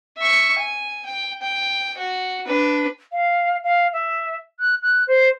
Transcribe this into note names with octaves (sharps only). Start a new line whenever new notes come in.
E5 C#6
G#5
G5
G5
F#4
D4 B4
F5
F5
E5
F#6
F#6
C5